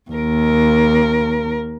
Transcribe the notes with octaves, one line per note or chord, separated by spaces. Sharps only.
D#2 A#4